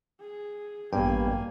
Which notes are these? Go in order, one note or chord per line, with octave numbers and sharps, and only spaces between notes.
G#4
A1 G2 A#3 B3 G5 G#5